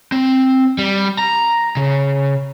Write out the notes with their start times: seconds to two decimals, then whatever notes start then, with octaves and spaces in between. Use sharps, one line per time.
0.12 C4
0.78 G3
1.18 A#5
1.77 C#3